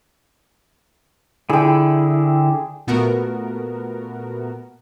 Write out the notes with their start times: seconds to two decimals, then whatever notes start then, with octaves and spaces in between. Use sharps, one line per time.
1.50 D3 E4 G#4 G5
2.87 A#2 A3 B3 F#4 A#4